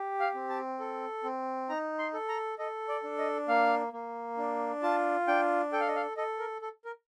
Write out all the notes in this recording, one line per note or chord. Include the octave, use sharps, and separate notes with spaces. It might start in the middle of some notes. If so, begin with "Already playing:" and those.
Already playing: G4
F5
C4
A5
A4
C4
D#4 A#5
C6
A4
A#5
A4 D#5
D5
D4
D#5
A#3 F5
A#3
D4
F4 A5
D4 G5
A4 G5
F5
D#5
F5
A4 D#5
A#4
A4
A#4